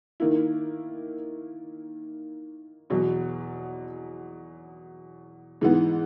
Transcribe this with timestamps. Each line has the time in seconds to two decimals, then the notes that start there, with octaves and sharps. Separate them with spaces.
0.20 D#3 A#3 E4
2.90 E2 B2 F#3
5.61 G#2 E3 B3